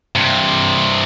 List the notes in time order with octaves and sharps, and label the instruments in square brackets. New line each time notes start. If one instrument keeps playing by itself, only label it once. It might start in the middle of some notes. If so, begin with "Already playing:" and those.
[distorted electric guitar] G2 C3